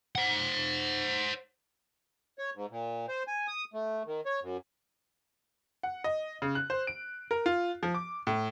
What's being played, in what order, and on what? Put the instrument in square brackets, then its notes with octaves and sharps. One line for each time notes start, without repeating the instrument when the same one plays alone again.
[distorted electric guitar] C5 F#5
[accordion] C#5
G#2
A#2
C5
G#5
D#6
A3
D#3
C#5
F#2
[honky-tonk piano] F#5
D#5
C#3
F#6
C5
D7
A#4
F4
F3
D6
A2